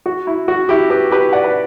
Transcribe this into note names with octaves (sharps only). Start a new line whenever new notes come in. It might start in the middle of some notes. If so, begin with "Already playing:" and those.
F#4
E4
F#4
E4 G4
G4 B4
G4 B4
D5 F#5
B4